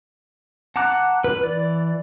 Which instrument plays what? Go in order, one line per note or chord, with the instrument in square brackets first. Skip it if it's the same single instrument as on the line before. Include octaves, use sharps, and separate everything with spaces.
[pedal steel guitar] F#5 A5 A#5 D6 F#6
B4
E3 D5